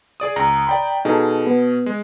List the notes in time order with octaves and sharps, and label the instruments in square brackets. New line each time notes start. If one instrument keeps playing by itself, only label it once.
[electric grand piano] G#4 D5 D#6
[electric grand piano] C#2 [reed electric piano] A#5
[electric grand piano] D5 G5 B5
[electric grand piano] B2 [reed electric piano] D#4 G#4 A4
[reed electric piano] B3
[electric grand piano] G#3